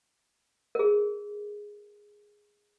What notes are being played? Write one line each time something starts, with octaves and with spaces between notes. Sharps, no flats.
G#4 A#4